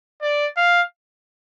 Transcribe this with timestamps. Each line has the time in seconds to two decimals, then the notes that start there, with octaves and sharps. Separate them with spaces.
0.22 D5
0.57 F5